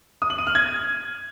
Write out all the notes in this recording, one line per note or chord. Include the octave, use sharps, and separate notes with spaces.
D#6
F#7
D#7
F6
G#6